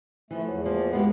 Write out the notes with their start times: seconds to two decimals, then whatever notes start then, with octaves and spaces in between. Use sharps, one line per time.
0.31 E3 F3 A3
0.47 E2 F#3
0.66 F3 A#3
0.93 G#3 A#3 B3 G4